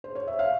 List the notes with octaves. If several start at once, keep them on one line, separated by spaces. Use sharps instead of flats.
C5
C#5
E5
F5